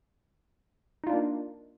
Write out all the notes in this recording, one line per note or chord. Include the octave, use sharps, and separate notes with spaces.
A#3 D4 D#4 F4